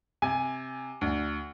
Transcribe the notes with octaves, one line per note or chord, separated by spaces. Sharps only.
C3 G#5
D2